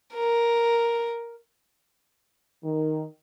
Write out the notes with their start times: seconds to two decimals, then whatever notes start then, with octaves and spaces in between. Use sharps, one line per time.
0.14 A#4
2.64 D#3